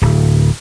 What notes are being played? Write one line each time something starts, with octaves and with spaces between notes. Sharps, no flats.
D1